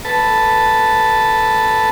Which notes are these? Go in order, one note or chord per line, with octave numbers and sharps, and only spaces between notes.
A4 B4 A5